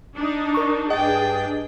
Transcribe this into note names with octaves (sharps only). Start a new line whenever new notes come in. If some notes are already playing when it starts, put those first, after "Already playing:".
D4 D#4
A#4 C#6
G2 D4 G#4 D#5 G5 A6